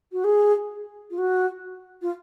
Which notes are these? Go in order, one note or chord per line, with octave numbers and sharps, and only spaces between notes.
F#4
G#4
F4
F#4
F4